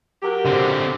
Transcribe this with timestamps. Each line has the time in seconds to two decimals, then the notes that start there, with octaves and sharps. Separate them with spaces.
0.22 F#3 G4 A#4
0.45 D3 C4